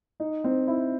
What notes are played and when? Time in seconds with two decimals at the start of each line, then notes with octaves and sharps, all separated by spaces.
0.20 D#4
0.44 C4
0.68 E4